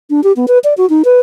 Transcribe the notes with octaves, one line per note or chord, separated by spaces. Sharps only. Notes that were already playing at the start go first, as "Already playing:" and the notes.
D4
G4
B3
B4
D5
F#4
D#4
B4